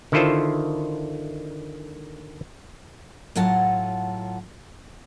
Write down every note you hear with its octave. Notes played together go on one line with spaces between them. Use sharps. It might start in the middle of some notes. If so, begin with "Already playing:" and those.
D3 D#3 E4 F4 A4 C5
A2 F#3 F4 F#5 A5